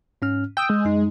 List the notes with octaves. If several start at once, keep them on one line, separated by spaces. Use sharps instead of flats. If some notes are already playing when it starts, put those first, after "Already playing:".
G#2 C#4 F6
G5 D#6 E6 G6
G#3
F#2 D#4